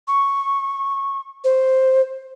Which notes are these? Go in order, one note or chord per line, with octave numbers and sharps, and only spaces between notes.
C#6
C5